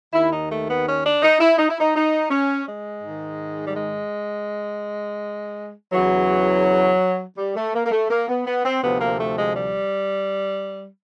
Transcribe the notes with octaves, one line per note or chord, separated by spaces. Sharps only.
D#2 D#3 E4
D#4
A3
B3
C#4
D4
D#4
E4
D#4
E4
D#4
D#4
C#4
G#3
G#2 D#3
G3
G#3
E2 C#3 E3 F#3
G3
A3
A#3
A#3
A3
A#3
B3
B3
C4
D2 C3 F3 B3
A#3
A3
G#3
G3